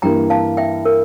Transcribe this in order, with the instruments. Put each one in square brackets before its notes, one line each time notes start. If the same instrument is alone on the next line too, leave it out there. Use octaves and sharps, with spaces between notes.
[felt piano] G2 E3 A#3 E4 [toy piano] G5 A#5
[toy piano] F5 A5
E5 G5
A#4